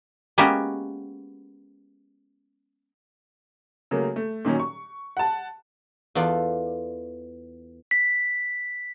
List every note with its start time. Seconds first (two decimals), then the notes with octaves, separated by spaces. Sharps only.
0.38 G#3 A#3 B3 C#4 F#4 G4
3.91 C#3 F#3 A3 A#3
4.16 A3
4.45 A#2 D#3 F#3 C#4
4.60 C#6
5.17 F#5 A5
6.15 E2 B3 E4 F4 A4 D5
7.91 B6